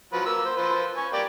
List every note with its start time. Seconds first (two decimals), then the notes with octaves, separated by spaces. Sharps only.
0.13 F3 F#3 B4
0.26 A#3 E6
0.45 C5
0.57 F3 B4 C5
0.97 G#5 C#6
1.13 A#3 G4 D5